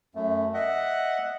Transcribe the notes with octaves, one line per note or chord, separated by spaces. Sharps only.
F#2 A3
D#5 E5 F#5